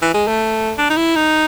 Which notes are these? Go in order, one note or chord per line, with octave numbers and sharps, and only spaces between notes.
E3
G#3
A3
D4
D#4
E4
D#4